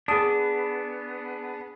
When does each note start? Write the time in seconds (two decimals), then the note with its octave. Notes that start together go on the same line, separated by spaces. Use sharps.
0.08 B3 D4 G#4 D#6